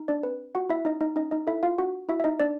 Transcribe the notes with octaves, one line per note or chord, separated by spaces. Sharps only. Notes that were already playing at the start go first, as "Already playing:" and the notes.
Already playing: D#4
D4 D5
C4 B4
F4 F#4 F#5
E4 E5
C#4 D#4 D#5
D#4 D#5
C#4 D#4 D#5
D#4 D#5
E4 A4 E5
F4 F5
D4 F#4 F#5
E4 F#4 E5
E5
D#4 D#5
D4 D5